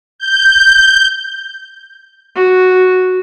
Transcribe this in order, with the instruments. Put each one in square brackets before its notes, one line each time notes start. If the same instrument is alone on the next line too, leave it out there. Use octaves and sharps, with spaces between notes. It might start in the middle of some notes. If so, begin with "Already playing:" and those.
[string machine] G6
[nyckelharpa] F#4